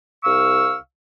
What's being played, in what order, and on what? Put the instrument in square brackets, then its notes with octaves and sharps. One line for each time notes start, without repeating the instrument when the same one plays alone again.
[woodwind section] C2 F5 C#6 E6